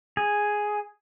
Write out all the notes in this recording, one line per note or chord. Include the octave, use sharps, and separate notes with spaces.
G#4